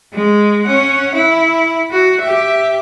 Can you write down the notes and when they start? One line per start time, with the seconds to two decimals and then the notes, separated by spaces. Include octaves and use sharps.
0.13 G#3
0.65 C#4 F#5
1.15 E4
1.92 F#4
2.21 G4 E5